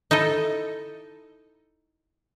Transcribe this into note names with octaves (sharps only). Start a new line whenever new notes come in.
D#4 E4 A4 D#5